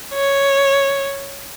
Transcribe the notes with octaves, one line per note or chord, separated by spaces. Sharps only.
C#5